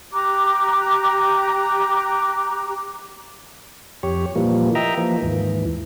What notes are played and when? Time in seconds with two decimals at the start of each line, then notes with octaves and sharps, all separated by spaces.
0.13 G4 A#5 D6 F#6
4.03 F2 G4 C#5
4.35 A#2 E3 F3 G3 A#3
4.75 D#5 E5 G5 A#5
4.97 E3 F3 A#3
5.22 D#2 G#2 E3